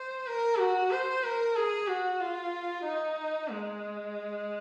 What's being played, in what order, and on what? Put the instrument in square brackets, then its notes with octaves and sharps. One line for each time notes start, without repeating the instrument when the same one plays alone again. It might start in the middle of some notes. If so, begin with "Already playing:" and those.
Already playing: [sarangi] C5
A#4
F#4
C5
A#4
G#4
F#4
F4
D#4
G#3